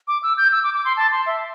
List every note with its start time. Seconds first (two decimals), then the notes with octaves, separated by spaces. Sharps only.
0.08 D6
0.23 E6
0.38 G6
0.52 E6
0.64 D6
0.74 D6
0.85 C6
0.97 A5
1.12 C6
1.26 E5